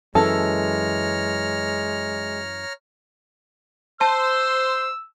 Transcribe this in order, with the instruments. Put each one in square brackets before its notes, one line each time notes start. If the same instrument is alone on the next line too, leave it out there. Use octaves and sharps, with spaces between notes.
[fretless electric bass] F#2 E3 [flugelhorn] G#3 [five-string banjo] A4 [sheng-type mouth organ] C#5 A#5 F6
[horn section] C5 [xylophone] A5 [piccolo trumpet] E6